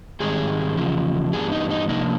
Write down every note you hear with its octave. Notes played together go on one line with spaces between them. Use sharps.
G#2 D#3 G3 C4 G#4
E2 C#3 F3
G2 E3 G3 B3 D4 G#4
D#4
D#4
C3 F3 A#3 D4 D#4